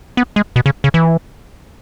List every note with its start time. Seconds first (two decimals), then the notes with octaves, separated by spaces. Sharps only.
0.17 B3
0.36 G#3
0.56 B2
0.66 C#3
0.84 C#3
0.94 E3